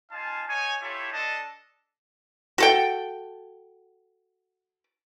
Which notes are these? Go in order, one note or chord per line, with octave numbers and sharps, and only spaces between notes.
D#4 F4 F5 G#5 A5
D#4 C#5 G#5
E4 F4 G4 A4 C#5
D4 A4 D#5 A5
F#4 A4 G5